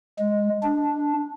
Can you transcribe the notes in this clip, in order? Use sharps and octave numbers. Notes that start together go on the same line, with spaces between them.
G#3
D4